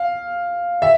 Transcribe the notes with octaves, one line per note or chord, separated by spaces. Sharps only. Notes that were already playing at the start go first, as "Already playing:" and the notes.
Already playing: F5
E5